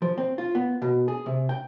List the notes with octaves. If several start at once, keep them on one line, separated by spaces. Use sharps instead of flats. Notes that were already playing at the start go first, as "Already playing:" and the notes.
F3
C4
F4
B3
B2
G#4
C3
G5